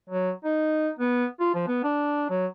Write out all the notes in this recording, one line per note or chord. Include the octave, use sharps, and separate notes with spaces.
F#3
D#4
B3
F4
F3
B3
D4
F#3